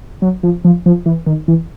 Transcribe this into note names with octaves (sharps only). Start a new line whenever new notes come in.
F#3
F3
F3
F3
E3
D#3
E3